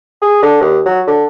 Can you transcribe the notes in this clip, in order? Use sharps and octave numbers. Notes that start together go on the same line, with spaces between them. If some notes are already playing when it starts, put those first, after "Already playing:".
G#4
D3
D#2
F#3
D3